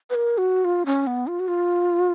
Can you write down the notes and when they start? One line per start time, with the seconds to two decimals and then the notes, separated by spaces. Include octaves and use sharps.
0.10 B4
0.15 A#4
0.38 F#4
0.65 F4
0.86 C#4
1.07 B3
1.27 F4
1.40 F#4
1.48 F4